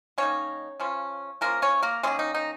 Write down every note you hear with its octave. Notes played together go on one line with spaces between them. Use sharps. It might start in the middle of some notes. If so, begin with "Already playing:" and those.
D#3 A#3 C#4 D#4 C#5
C#3 F3 C#4
F3 A#3 C#4 A#4
C#4 C#5
A#3 A#4
D#3 G#3 A#3 C#4 G#4
D#4
D#4